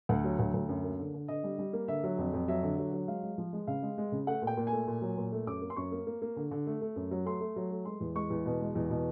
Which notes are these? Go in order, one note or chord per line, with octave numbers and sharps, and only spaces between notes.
D2 F#5
F#3
D2
D2
F#2
A#3
D3
D3
D3 D#5
G3
G3
A#3
D3 E5
F#3
F2
F2
F#3 E5
D3
F#3
F#3
G#3 F5
G#3
F3
G#3
C#3 F5
G#3
G#3
C#3
A3 F#5
A#2
G5
A#2
G#5
A3
A#2
F#3
A#2
A3
F#2 D6
A#3
C6
F#2 C#6
A#3
A#3
A#3
D3
D3
A3
A3
F#2
F#3
A3 C6
A3
F#3
A3
G#3 C6
E2
G#3 C#6
E2
B2
G#3
E2
B2